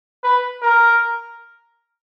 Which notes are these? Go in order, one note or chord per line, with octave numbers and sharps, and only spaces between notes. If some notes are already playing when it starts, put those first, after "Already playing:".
B4
A#4